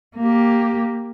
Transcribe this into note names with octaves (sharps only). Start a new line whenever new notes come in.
A#3 G4